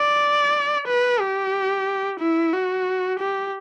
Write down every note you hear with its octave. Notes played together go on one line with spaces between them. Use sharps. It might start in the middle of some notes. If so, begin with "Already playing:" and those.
Already playing: D5
B4
G4
E4
F#4
G4